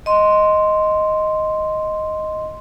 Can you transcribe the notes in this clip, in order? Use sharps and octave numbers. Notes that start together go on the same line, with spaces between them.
D#5 C6